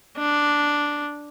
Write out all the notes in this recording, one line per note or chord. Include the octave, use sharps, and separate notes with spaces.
D4